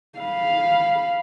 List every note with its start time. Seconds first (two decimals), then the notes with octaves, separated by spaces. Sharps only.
0.19 F5 B5